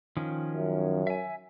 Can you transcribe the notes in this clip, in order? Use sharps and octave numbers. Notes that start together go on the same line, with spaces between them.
D#3 F3 C#4
F#2
E5 G#5